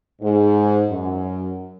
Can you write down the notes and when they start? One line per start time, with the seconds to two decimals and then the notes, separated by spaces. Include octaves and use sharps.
0.22 G#2
0.90 F#2